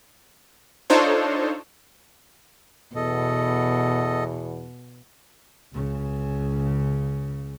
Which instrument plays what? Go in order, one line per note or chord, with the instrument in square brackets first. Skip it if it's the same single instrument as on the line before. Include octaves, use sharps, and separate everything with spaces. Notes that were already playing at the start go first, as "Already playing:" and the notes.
[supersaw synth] D4 D#4 F4 A4 C5 C#5
[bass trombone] E2 [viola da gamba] B2 [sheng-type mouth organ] A4 D#5
[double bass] C#2 C#3